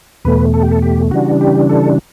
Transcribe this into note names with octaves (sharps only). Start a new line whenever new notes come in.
E2 B2 A3 B4
A4
G4
A4
G4
C#3 E3 G3 D4 F#4
G4
A4